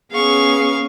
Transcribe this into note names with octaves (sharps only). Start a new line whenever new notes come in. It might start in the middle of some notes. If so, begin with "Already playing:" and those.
B3 C#4 G#4 F5 C#6